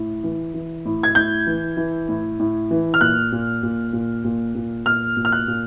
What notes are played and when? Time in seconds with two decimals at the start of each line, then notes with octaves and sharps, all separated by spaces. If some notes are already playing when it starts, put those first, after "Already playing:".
Already playing: A2
0.23 E3
0.54 E3
0.85 A2
1.03 G#6
1.15 A2 G6
1.47 E3
1.77 E3
2.09 A2
2.39 A2
2.71 E3
2.94 F6
3.01 A#2 F#6
3.32 A#2
3.63 A#2
3.93 A#2
4.24 A#2
4.55 A#2
4.86 A#2 F6
5.17 A#2
5.25 F6
5.32 F#6
5.48 A#2